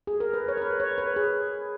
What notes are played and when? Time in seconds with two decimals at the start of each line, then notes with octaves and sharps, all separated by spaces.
0.07 G#4
0.20 A#4
0.33 B4
0.48 C#5
0.57 A#4
0.62 B4
0.80 C#5
0.98 B4
1.16 G#4